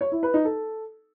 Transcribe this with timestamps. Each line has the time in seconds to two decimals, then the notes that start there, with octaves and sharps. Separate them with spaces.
0.01 C#5
0.12 E4
0.23 B4
0.34 D#4
0.45 A4